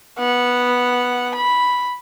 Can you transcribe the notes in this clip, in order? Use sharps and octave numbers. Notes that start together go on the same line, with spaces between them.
B3 F#5
B5